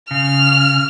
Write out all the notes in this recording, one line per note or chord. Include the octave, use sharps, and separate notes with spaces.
C#3 F6